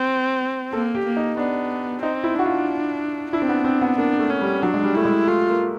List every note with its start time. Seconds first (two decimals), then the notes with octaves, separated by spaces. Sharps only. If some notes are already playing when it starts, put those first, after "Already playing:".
Already playing: C4
0.73 A#3 A4
0.95 G4
1.05 A#3
1.17 D#4
1.37 B3 D4
2.02 C4 D#4
2.24 E4
2.35 D4 F#4
2.45 F4
3.32 D4 E4
3.42 C4
3.49 B3
3.64 C4
3.82 B3
3.98 A#3 D4
4.19 A3
4.30 C#4
4.41 G3
4.63 F#3 D4
4.74 G#3
4.83 G3
4.95 A3 E4
5.05 G#3
5.27 A3 F4
5.50 A#3